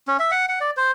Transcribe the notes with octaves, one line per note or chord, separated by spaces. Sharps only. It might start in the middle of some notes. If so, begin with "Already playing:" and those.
C#4
E5
F#5
F#5
D5
C5